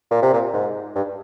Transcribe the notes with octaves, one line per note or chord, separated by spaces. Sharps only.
A#2
C3
A#2
G#2
G2